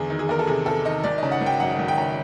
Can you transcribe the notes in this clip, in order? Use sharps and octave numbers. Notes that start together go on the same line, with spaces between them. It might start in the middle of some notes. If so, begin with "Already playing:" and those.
Already playing: E2 D3 G#4
D#3
G#4
E2 A#4
A4
C3 G#4
E2 A4
D#3 D#5
G#1 D5
C#3 D#5
F#5
G#1
G5
F#2 F#5
G#1
G5
C#3